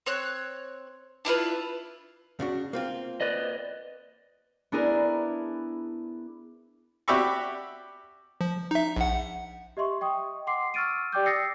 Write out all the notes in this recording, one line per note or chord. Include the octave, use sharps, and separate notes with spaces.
C4 C#5 F#6
D4 E4 F4 B4
C#3 D4 F#4
A#3 C4 F4
B4 D5 D#5
B3 D4 E4 G#4 A#4 B4
F#4 G4 D5 E5 B5 C#6
F3
D#4 E5
A#1 F#5
G4 D#5 E5 C6 C#6
D#5 G5 C#6 D#6
F#5 C6 D6 C7
C#6 E6 F6 A6 D7 D#7
G4 D5 G5 D6 G6
D#6 E6 A6 A#6 C7 C#7